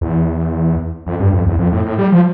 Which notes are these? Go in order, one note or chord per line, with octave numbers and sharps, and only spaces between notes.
E2
F2
G2
F2
E2
F2
A2
A2
G3
F3